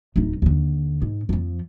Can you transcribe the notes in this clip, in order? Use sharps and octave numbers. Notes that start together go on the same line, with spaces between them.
D1 D#4
D#2 D3
G#2
F2 F3